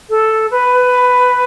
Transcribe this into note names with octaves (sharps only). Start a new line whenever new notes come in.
A4
B4